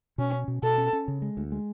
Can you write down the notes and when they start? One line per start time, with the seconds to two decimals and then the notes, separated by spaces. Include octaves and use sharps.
0.18 B2 C#4
0.33 C#4
0.48 B2
0.62 B2 A4
0.78 C#4
0.93 C#4
1.08 C#3
1.22 G#3
1.37 D2
1.52 G#3